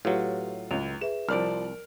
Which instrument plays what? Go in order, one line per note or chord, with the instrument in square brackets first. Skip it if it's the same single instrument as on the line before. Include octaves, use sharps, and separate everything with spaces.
[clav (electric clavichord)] A2 F#3 [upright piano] F4 [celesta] G4 B4
[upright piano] C#2 [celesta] F7
[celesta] G#4 B4 E5 [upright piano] E7
[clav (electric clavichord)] C2 [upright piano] F3 D5 F6 [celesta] A#4 D7